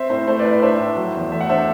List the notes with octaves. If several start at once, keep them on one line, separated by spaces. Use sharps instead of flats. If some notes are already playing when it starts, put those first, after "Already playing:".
Already playing: C4 C5 E5
A2 C5
A3 C5
B4 D5
A2
B4 D5
D4 C5 E5
A2
F#3
E2
A3 E5
F#5
D4 C5 E5